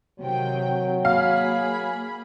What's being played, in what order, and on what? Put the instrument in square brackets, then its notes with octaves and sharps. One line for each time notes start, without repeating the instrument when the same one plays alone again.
[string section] C3 D#3 G5 [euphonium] F#3
[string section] A#3 G#4 B5 [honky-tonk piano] F5